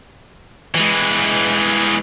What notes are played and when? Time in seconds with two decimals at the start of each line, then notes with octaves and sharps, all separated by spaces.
0.75 E3 G#3